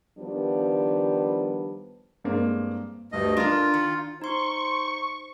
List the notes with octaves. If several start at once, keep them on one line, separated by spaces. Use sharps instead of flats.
D#3 F3 G3 B3 D4
G2 G#3 A#3 C4
D2 G2 D#5
D4 F4 A#4
D#3
D#4 C5 C6 C#6